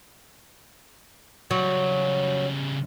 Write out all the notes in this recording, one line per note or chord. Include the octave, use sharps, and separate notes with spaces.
C#3 F#3 G3